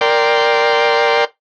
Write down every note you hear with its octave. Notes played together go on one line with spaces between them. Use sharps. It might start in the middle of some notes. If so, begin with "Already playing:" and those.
A#4 D5 G5 C6